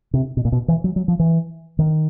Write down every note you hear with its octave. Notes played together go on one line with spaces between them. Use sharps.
C3
B2
A#2
B2
E3
F#3
F#3
F3
E3
D#3